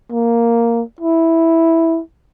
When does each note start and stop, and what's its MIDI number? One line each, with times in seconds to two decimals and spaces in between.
0.12 0.83 58
1.00 2.01 64